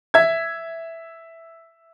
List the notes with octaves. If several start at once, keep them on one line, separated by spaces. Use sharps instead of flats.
E5 G#6